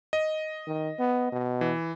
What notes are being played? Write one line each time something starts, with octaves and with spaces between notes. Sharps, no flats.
D#5
D#3
B3
B2
E3